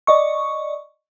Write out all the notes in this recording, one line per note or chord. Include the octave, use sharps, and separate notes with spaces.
D5 D#5 C#6